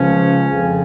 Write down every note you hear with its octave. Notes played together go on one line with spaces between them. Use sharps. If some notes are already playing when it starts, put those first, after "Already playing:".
Already playing: C#2 C#3 F3 C#4
F2 C#3 F3